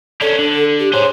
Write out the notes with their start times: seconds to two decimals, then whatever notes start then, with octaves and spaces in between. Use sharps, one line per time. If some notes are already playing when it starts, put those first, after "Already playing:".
0.21 C#4 D4 A4
0.39 D3
0.80 G4
0.93 G#4 C5 C#5